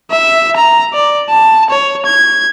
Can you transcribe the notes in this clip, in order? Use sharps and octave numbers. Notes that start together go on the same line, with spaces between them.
E5
A#5
D5
A5
C#5
G#6